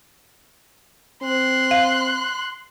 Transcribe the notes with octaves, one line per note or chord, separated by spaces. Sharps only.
C4 C6 F#6
F5